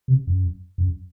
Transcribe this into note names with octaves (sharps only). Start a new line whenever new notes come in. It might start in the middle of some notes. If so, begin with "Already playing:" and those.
C3
F#2
F#2